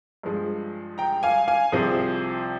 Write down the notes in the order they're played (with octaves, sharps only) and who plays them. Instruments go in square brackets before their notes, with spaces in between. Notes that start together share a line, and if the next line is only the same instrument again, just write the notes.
[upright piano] G2 F3 G#3
G5 A#5
F5 G#5
F5 G#5
C2 C3 F3 G#4 C5